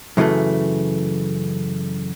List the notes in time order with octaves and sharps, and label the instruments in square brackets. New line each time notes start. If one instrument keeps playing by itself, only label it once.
[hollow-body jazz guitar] F#2 C#3 E3 G#3 A3